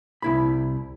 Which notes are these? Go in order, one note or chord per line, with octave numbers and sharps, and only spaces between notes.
C2 E4 B5